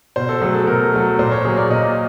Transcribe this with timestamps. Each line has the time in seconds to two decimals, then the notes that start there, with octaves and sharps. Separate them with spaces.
0.16 B2 C5
0.29 A4
0.42 F#3 A3 G#4
0.55 A4
0.67 B2 A#4
0.93 F#3 A3
1.19 A#2 C5
1.32 C#5
1.45 F#3 A#3 G#4
1.57 D5
1.70 A#2 D#5